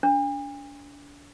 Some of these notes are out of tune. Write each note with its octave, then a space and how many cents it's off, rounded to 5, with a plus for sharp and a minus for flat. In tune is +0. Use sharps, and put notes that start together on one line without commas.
D4 -35